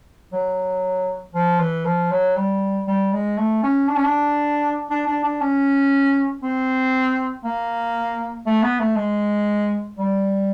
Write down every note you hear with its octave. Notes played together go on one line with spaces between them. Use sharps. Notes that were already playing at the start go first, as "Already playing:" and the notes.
F#3
F3
E3
F3
F#3
G3
G3
G#3
A3
C#4
D4
C#4
D4
D4
D4
D4
C#4
C4
A#3
A3
B3
A3
G#3
G3